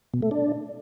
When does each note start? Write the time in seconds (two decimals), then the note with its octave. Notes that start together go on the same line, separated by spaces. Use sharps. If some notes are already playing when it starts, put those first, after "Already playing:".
0.14 B2
0.22 A3
0.31 D4